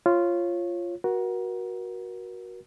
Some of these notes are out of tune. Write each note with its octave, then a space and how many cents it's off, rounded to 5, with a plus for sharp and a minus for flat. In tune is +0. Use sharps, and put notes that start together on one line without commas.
F4 -10 C#5 -20
F#4 +0 A#4 +35